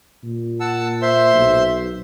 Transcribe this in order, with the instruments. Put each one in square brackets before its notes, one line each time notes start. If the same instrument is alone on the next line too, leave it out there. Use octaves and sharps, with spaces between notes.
[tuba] A#2
[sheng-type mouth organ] F#5 A5 E6
C5 E5 C6
[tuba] B1